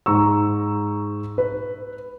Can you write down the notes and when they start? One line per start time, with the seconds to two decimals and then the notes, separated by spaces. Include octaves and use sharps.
0.06 G#2 A#5 C#6 E6
1.38 B4